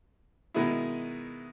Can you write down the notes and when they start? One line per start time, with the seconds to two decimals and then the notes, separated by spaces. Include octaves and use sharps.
0.54 B2 D#3 G#3 B3 D#4 E4